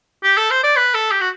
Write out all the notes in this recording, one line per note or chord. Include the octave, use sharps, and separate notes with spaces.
G4
A4
C5
D5
B4
A4
G4
F#4